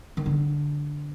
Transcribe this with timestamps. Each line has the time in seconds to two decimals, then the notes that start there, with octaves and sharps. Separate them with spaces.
0.17 D#3
0.26 D3